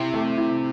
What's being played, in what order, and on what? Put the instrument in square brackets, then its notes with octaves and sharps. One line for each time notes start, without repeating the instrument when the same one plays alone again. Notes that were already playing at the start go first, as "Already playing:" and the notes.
Already playing: [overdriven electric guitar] C3 [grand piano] E4
[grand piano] A3
E4